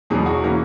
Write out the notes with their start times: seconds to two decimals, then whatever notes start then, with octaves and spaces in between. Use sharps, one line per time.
0.10 E2 B2 F#3 G#4
0.26 F#4
0.44 E3 A#3 C#4